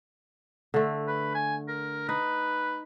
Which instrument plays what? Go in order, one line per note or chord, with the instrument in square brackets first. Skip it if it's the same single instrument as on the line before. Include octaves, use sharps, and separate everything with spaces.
[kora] D3 A3
[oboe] B4
G#5
A#4
[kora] D#4 [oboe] B4